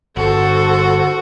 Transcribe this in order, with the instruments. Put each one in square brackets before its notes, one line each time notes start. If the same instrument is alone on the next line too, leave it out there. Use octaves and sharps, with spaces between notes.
[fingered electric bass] G1 [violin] F#4 [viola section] A4 C5